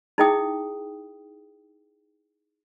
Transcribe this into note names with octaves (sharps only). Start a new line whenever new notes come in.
D#4 E4 G#4 E5 G5 D#6